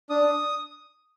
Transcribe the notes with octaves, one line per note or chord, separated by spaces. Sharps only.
D4 D#6